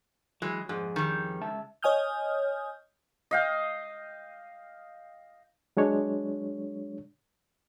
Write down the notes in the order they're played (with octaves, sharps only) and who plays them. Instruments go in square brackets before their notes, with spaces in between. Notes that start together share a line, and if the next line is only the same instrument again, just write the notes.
[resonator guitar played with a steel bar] E3 G#3 [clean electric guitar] F#3
[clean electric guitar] F2 G#4 [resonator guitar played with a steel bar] G#2
[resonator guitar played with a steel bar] D#3 G3
[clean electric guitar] C#2 E5 A5
[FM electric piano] C#5 D#5 G#5 D#6 F6 G6
[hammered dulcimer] D#5 F5 G5
[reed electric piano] F#3 G#3 D4 C#5